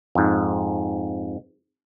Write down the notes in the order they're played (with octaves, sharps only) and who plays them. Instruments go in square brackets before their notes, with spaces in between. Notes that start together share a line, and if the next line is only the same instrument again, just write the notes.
[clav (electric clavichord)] F2 G#2